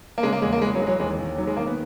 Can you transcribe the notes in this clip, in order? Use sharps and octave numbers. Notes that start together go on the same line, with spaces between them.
A#3
C#3 G#3
A#3
E2 G#3
A#3
E3 G#3
F#3
E3 G#3
F#3
D#2 G#3
D#2
D#3 F#3
G#3
D#3 A#3
B3